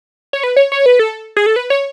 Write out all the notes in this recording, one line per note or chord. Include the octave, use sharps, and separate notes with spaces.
C#5
B4
C#5
C#5
B4
A4
G#4
A4
B4
C#5